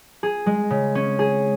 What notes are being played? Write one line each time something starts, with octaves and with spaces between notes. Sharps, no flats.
G#4
G#3
C#3
C#4
G#4